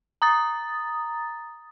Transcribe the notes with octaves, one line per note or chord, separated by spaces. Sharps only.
A#5 D#6 A6